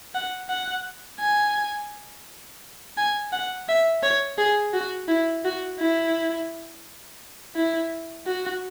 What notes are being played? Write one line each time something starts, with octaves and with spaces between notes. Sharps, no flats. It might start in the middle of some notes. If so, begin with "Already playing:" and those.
F#5
F#5
G#5
G#5
F#5
E5
C#5
G#4
F#4
E4
F#4
E4
E4
F#4